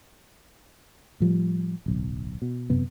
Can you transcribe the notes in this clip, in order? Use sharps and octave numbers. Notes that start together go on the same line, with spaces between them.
A2 F3 G3
D1 B1
B2
E1 F#2 C3 B3